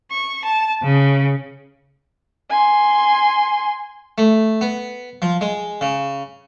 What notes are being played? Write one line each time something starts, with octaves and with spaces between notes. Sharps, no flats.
C#6
A5
C#3
G#5 C6
A3
B3
F3
G#3
C#3